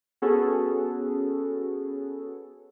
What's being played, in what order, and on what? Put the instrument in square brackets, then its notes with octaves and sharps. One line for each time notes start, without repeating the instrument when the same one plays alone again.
[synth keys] B3 C#4 F#4 G#4 A4